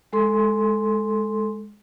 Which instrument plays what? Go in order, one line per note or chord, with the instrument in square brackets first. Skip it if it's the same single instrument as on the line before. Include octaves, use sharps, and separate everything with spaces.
[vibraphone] G#3 A4 C6